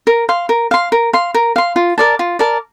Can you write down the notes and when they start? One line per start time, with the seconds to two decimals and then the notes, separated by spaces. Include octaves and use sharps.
0.07 A#4
0.29 F5 C6
0.49 A#4
0.71 F5 C6
0.92 A#4
1.13 F5 C6
1.34 A#4
1.56 F5 C6
1.76 F4
1.98 A#4 D5 A5
2.19 F4
2.39 A#4 D5 A5